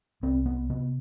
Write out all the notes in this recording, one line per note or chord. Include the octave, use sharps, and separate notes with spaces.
C2 C4
B3
C3 B3